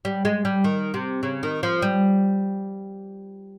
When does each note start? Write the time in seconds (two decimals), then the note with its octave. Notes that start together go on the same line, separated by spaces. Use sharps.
0.05 G3
0.25 G#3
0.45 G3
0.64 D#3
0.94 C3
1.23 C#3
1.43 D#3
1.63 F3
1.82 G3